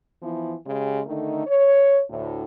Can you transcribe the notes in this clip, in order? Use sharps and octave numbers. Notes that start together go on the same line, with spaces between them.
E3 F3 B3 E4
C#3 G#3 G4
D3 D#3 A3 D#4
C#5
D2 A2